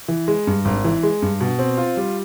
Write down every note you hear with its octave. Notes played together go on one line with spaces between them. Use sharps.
E3
G#3
G2
G#1
E3
G#3
G2
B2
C4
F4
G3